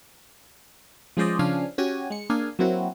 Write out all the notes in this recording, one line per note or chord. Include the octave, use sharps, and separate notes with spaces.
F3 G#3 C#4 C5 D5 D#5
C#3 F3 C#4 D4 F5 G#5
C#4 F#4 G4 G#5
G#3 C#7
A#3 D4 G#4 F5 G#5
F#3 A#3 C4 E4 F#4